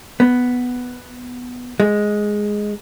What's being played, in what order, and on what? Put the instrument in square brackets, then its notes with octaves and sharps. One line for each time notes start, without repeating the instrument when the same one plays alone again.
[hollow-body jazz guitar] B3
G#3